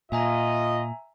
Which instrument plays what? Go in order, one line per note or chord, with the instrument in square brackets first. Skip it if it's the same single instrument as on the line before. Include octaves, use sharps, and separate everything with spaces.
[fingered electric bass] A#2 [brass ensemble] F4 D#5 [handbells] E5 G#5 A#5